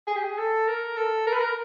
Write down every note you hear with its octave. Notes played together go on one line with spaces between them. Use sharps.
G#4
G4
G#4
A4
A#4
A4
A#4
B4
A#4